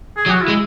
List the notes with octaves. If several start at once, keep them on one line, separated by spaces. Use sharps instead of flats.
G#4
F#3
F#4
E4
G#3